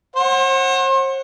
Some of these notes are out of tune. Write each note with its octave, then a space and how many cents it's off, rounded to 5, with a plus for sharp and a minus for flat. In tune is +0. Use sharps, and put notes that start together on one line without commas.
C5 +40 F#5 +0